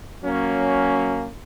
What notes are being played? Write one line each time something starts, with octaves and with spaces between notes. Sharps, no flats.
F#3 A#3 C#4